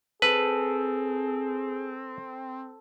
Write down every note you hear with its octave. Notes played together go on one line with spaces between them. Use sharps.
C4 G#4 A4 B4